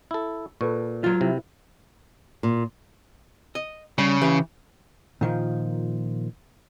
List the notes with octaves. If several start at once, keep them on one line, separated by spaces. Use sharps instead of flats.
E4 A4
A#2 A4 B4 C#6
F#3 F4
C3 E4
A#2
D#5
C#3 G3
E3 G4 B4
A#2 D#3 F3